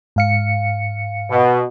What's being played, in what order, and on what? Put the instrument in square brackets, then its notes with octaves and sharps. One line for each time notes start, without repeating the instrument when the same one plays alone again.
[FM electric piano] G#2 F5 C#7
[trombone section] B2